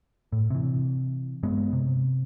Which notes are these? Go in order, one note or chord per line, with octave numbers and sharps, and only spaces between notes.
A2
C3 E3
G2 G#3 B3
C3